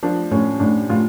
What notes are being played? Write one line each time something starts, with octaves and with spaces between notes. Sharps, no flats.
F3 D4
A2 C#4
A2 D4
A2 F4